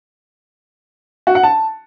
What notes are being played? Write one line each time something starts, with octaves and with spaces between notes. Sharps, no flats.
F#4
F#5
A5